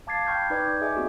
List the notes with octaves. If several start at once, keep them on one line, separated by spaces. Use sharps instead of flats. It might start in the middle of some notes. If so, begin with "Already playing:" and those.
F5 A5 D6 G#6 A6 C7
G5 B5 C#6 F6 G6
D#4 B4 D5 D6 G6 G#6
D#4
G#4 D#5 E5 G#5 D6
A#3 C4 F#4 G#4 A4